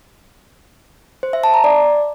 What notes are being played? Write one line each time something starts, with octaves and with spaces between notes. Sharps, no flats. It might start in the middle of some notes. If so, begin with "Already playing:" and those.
C5
E5
A5
A#5
D5